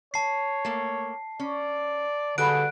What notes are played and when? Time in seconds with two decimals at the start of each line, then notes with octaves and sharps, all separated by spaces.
0.14 C#5 A5 C7
0.65 A3 A#3
1.40 C#4 D5
2.38 D3 G3 F#4 G#4 B4 F#6 D7